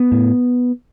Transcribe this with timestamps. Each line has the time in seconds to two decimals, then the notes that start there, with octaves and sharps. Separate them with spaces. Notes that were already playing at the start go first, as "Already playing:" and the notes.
Already playing: B3
0.12 A2